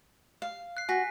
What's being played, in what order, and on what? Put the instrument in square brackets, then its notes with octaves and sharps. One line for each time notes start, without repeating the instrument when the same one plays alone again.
[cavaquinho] F5
[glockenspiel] F#6 C7
[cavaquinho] F#4 [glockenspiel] G#5 B6